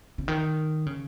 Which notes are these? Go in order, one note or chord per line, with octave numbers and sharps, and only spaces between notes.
C#3
D#3
C#3